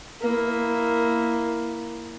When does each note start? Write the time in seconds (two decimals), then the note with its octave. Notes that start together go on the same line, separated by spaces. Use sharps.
0.21 A#3 E4